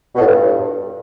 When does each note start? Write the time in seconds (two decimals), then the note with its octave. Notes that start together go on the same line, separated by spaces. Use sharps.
0.16 B2
0.21 A2
0.26 G2